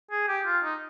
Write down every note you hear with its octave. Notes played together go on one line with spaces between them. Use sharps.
G#4
G4
F4
D#4